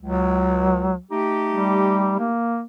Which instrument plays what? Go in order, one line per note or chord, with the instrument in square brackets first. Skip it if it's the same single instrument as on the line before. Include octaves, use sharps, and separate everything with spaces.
[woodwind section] C#2 [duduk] F#3
[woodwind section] A3 D#4 G4
[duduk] G3
A#3